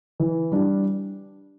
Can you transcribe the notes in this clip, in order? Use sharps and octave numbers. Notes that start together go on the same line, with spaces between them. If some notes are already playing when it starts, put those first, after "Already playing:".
E3
G3 D4